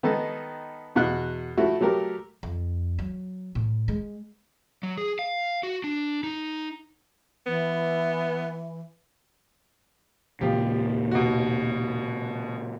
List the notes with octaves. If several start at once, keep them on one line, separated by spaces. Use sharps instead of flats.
D#3 B3 D#4 A4 D#5
E2 B2 F#5 F#6
F3 A3 E4 F#4
F#3 A3 G4 A#4
F2
F#3
A2
G#3
F#3
G#4
F5
F#4
D4
D#4
E3 B3
D#2 A#2 C#3 F3 G4
B2 F#4